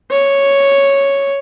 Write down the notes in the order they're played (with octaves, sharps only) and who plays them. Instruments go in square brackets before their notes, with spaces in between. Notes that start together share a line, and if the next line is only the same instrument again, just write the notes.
[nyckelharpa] C#5